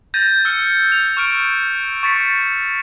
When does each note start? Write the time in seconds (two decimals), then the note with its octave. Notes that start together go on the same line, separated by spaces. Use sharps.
0.14 G6 A6 A#6 D#7
0.45 E6 F6 C#7
0.92 F7
1.17 C#6 F6 D7
2.03 C#6 A6 B6 C#7